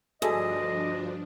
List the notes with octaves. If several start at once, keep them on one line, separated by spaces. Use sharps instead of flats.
D2 G2 F3 D4 G#4 A4 D#5 E5